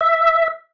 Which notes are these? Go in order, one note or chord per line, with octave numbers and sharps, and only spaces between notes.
E5